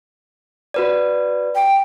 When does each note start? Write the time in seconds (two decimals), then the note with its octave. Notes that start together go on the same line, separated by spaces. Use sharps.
0.74 F#4 B4 D5
1.55 G5